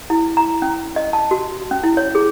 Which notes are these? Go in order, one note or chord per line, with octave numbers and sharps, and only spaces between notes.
E4
A#5
C#4
D#5
A5
F#4
C#4
E4
C#5
G#4